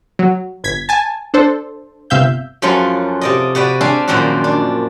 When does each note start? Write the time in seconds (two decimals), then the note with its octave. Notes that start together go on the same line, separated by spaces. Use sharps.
0.19 F#3
0.64 G1 G#6 B6
0.89 G#5 A5
1.34 D4 A4 C5
2.10 G1 C3 E5 F5 G6
2.62 F#2 F3 F#3 A3 F4 G#5
3.21 C3 D5 D#5
3.55 C3 F#4 B4 D5
3.81 C4 D4 E5 F5 G#5 A5
4.08 F#2 A#2 D#3 F3 C4 F#4
4.44 D4